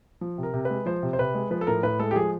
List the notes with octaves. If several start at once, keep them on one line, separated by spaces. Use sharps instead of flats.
F3
C3
A#4
C3
B4
G#3
F3 C5
C3
C5
C3 B4
G#3
F3 B4
A4
A2 A#4
A2 B4
G#3 A4
G4
F3 G#4